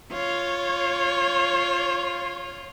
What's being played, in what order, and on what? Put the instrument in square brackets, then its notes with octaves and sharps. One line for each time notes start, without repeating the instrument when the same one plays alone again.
[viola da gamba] F4 [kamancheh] C#5